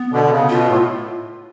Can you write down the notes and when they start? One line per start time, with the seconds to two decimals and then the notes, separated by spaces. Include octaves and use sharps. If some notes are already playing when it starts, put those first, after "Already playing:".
Already playing: B3
0.12 B2 D3
0.24 B2
0.31 C#3
0.50 B2 F4
0.69 A2